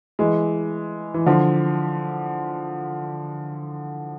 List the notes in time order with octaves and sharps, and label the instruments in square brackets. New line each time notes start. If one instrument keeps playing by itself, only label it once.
[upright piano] E3 G#3
E3
D3 F3